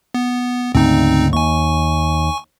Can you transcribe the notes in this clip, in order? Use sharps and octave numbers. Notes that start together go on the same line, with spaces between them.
B3
D2 G#2 C#3 C4 D#4
D#2 G#5 C#6